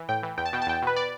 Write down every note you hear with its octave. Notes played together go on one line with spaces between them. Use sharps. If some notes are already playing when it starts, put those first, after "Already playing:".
Already playing: E3
A2 G5
E3
E2 G5
A5
B2 G5
A5
E2 G5
B2 B4
D5